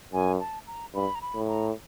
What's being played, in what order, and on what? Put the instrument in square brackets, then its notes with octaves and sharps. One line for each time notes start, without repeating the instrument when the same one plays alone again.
[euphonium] F#2 [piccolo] G#5
[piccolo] A5
A#5
[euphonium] G2 [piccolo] B5
[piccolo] A#5
B5
[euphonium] A2
[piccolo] A#5